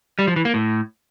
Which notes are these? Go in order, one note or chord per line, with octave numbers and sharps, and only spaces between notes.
G3
F3
E3
A#3
A2